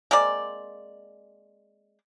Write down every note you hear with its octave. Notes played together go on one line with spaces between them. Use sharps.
G#3 A#3 C4 D5